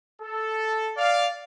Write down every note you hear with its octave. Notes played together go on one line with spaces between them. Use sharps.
A4
D5 F5